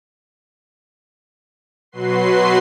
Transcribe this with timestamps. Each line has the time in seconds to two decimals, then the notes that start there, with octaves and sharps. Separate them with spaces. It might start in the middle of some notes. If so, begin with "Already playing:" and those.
1.92 B2 F#3 F#4 B4 C6 C7